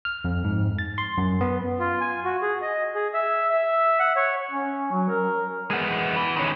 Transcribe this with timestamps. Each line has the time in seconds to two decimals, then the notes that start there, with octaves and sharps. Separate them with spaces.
0.05 F6
0.24 F2
0.44 G#2
0.79 A6
0.98 C6
1.18 F#2
1.41 B3
1.80 F4
2.01 G#5
2.24 F#4
2.42 G#4
2.62 D#5
2.95 G#4
3.14 E5
3.50 E5
3.99 F#5
4.16 C#5
4.51 C#4
4.92 F#3
5.09 A#4
5.70 G#3 B3
6.16 E3
6.36 D#3 C#4